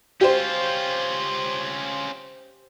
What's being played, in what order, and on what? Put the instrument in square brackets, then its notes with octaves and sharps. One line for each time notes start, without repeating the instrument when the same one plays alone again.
[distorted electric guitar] C#4 F4 [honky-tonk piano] G4 C5